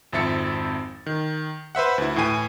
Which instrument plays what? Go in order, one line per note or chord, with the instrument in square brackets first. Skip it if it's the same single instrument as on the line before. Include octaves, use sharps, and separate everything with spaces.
[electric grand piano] G#1 F2 C4 E5 A6 C#7
D#3
B4 C5 E5 F#5
D2 E4
A2 E3 G5 G#5 D#7